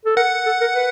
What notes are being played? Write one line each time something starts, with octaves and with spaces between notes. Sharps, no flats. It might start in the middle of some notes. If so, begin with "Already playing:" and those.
A4
A#4 F#5
A4
A#4
B4